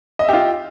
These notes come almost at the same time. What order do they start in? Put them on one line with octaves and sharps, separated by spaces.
D#5 E5 G4 F4